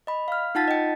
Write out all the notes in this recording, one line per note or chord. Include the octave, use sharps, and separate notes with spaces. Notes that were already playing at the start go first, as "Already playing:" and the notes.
D#5 B5
F5 F6
D#4 F4 F#5 A5 A6 B6
D#5 G5